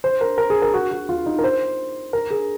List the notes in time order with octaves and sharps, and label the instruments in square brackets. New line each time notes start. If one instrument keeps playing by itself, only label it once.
[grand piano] C5
A#4
A#4
G#4
A#4
F#4
F#4
F4
D#4
A#4
C5
A#4
G#4